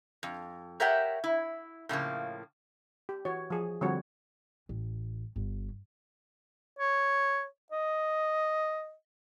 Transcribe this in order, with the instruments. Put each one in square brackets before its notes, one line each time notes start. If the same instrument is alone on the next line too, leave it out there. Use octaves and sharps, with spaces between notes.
[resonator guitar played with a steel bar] F2
G4 A#4 C#5 E5 F#5 G5
E4
A2 C#3 F3 A#3
[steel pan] G4
E3 F#4 C#5
F3 G#4
D3 F3 G3 C4 F#4 C#5
[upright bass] A1
G1
[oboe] C#5
D#5